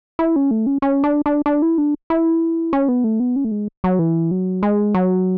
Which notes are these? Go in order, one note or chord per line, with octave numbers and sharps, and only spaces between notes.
E4
C#4
A3
C#4
C#4
D4
D4
D4
E4
D4
E4
C#4
B3
A3
B3
C#4
A3
G#3
F#3
E3
F#3
G#3
F#3